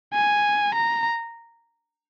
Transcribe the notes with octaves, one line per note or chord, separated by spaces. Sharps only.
G#5
A#5